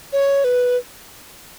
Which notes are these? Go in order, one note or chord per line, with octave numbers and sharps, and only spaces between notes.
C#5
B4